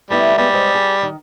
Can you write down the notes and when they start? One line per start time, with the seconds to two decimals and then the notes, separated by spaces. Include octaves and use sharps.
0.10 G3 A3 B3 E4
0.38 G3 G#3 B3
0.53 G#3 C5 D#5
0.75 G#4
1.03 D#3